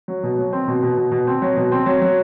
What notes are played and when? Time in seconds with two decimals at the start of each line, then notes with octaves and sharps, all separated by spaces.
0.08 F#3
0.23 B2
0.38 F#3
0.53 C4
0.67 B2
0.83 B2
0.98 B2
1.12 B2
1.27 C4
1.42 F#3
1.56 B2
1.72 C4
1.86 F#3
2.02 F#3